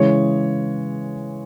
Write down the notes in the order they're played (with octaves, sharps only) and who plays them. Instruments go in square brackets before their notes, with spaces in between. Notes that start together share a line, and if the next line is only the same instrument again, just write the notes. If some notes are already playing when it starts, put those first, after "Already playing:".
Already playing: [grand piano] C#3 E3 G#3 C#5